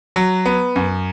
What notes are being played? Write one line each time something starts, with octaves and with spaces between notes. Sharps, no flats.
F#3
B3
F#2